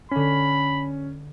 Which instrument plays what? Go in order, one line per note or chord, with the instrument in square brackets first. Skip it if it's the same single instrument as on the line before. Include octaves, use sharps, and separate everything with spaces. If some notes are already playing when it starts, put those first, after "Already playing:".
[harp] D3 B6 [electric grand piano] C#4 [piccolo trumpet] B5